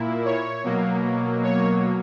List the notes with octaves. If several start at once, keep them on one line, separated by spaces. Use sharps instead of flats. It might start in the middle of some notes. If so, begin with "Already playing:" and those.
Already playing: A#2 A#3 E4
C#5
B2 F#3 A#3
C#5